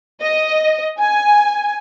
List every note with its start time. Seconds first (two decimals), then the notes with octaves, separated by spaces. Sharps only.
0.22 D#5
0.99 G#5